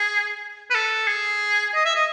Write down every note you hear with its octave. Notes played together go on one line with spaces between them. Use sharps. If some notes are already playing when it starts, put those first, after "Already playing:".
Already playing: G#4
B4
A4
G#4
D#5
E5
D#5